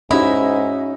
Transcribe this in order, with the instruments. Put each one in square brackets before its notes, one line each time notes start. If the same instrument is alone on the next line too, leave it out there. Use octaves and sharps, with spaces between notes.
[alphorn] G#2 [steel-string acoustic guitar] C#4 [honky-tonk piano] D#4 F#4 [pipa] E4